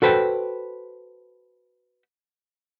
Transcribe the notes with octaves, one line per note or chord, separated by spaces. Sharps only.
F#4 A4 B4 C5 G5